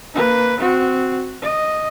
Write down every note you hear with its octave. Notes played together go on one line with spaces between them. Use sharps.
A#3 B4
C4 F#4
D#5